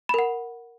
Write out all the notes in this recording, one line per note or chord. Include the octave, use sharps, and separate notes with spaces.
A#4 F#5 B5